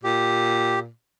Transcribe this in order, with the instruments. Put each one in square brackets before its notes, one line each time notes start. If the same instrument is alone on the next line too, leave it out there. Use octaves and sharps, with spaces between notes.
[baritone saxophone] A#2 [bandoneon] G4